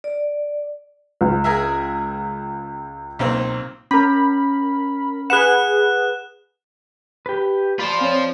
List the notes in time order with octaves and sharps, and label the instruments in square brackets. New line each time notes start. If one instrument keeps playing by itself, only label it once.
[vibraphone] D5
[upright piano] C#2
[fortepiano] G#4 A#4 E5
B1 A#3 C4
[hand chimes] C#4 [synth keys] A#4 B5
[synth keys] G#4 B4 F#5 [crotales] F#6 E7
[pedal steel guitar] G4 B4
[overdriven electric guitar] F4 C5 [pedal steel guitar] D5 B5
[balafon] C4 C#5